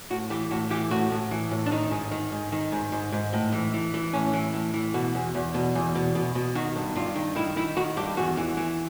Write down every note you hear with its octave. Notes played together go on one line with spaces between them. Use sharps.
A2 F#4
E3 G4
A2 F#4
E3 G4
A2 F#4
A2
E3
A2
D4
D#3 D#4
G#2
D#3
G#2
D#3
G#2
G#2
G#2
A2
E3
E3
E3
A2 C#4
E3
A2
E3
B2 F#4
E2
E2
B2
E2
B2
B2
B2
D#3 F#4
G2
G2 F4
D#3
D#3 E4
D#3 E4
D#3 F#4
G2 G4
E2 F#4
E3
E3